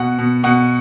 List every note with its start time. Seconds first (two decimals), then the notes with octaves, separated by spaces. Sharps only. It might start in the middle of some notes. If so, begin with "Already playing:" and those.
Already playing: B2 F#5
0.19 B2
0.44 B2 F#5